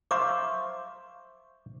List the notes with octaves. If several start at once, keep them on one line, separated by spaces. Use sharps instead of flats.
C5 E5 F5 A#5 C#6 D6